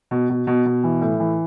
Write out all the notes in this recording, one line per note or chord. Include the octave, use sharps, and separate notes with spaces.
B2
B2
B2
B2
E3
A2
E3